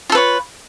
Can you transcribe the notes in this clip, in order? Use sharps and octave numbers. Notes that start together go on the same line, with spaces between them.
F4 A4 B4 C#5